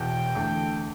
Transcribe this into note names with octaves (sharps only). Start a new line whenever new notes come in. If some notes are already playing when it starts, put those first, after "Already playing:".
Already playing: E1 E2 B2 G5
E2 D3 A3